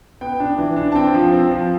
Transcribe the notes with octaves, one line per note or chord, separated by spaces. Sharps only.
B3 G5
D4
E3
D4
A5
C4 G5
F3
C4
F3